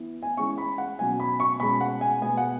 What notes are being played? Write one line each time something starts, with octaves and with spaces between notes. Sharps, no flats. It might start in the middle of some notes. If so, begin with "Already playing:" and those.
Already playing: E3 B3
G#5
E3 G#3 C#4 C#6
B5
F#5
B2 F#3 C#4 G#5
B5
C#6
B2 G#3 C#4 B5
F#5
G#5
B2 G#3 B3 G#5
F#5